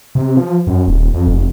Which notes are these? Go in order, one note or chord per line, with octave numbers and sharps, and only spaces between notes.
C3
F3
F#2
D#1
F2
F1